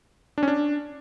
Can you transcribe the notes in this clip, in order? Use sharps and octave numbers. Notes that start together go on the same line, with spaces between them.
D4
C#4
D4